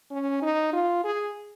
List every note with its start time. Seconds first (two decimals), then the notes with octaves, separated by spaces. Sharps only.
0.11 C#4
0.42 D#4
0.73 F4
1.04 G#4